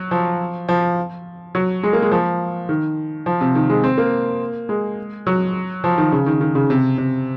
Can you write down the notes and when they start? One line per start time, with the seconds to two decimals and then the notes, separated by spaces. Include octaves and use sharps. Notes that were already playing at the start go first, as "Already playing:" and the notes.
Already playing: F#3
0.11 F3
0.69 F3
1.55 F#3
1.83 G#3
1.93 A#3
2.02 G#3
2.12 F3
2.69 D#3
3.26 F3
3.41 C3
3.55 D#3
3.69 G#3
3.84 C4
3.98 A#3
4.69 G#3
5.27 F#3
5.84 F3
5.98 D#3
6.12 C#3
6.26 D#3
6.41 D#3
6.55 C#3
6.70 C3
6.98 C3